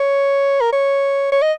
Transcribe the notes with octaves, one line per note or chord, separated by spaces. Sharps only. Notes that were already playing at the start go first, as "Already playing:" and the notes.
Already playing: C#5
A#4
C#5
C#5
D#5